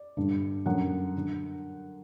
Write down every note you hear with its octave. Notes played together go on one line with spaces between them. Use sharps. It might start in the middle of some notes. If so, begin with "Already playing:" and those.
Already playing: D5
G2 D3
F#2 D3 F#5
D3